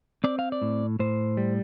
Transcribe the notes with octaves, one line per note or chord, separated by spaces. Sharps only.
C4 D5
F5
D5
A2
A2 C5
G3